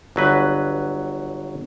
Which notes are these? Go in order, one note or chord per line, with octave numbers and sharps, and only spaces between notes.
G1 F#3 B4